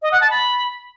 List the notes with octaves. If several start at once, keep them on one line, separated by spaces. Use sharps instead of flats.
D#5
F#5
A5
B5